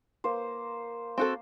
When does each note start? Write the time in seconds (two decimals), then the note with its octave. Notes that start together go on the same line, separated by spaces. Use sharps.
0.24 A#3 C5
1.18 C4 F#4 A4